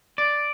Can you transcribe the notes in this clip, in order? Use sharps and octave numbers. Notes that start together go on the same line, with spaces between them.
D5